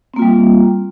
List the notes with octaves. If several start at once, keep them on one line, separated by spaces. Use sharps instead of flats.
G3 A#3 C4 F4